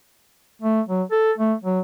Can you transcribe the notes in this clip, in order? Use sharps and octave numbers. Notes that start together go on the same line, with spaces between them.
A3
F#3
A4
A3
F#3